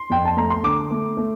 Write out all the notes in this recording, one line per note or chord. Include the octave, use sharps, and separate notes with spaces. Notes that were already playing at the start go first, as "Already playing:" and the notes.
Already playing: C6
F2 G5
A5
A3 A#5
C6
D3 D6
A3
A3